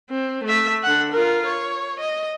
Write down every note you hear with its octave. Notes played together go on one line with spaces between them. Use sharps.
C4
A3 E5
D3 F#5
F4 A#4
C#5
D#5